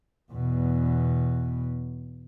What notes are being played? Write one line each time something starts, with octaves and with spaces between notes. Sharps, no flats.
E2 B2